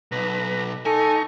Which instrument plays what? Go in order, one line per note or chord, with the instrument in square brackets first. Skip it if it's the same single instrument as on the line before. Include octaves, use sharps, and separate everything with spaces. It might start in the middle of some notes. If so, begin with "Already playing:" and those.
[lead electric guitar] B1 [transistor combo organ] B4 A#5
[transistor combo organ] D#4 A#5 C#6 [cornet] A4 [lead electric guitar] G#5